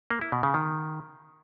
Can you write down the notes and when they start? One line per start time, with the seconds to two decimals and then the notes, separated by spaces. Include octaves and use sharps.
0.10 A#3
0.21 E4
0.32 B2
0.43 C#3
0.54 D#3